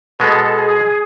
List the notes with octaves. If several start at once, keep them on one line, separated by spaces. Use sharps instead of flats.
B2 G#3 B3 A4 B4
G#4